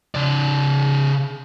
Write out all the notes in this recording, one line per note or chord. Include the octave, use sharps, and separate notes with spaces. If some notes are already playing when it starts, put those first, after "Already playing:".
C#3 D5